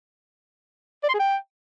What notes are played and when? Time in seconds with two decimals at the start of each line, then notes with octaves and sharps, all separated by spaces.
1.04 D5
1.09 C6
1.14 G#4
1.20 G5